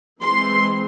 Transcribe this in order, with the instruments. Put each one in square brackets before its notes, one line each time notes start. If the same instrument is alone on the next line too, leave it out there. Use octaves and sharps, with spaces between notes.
[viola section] E3 G#3 C4 C6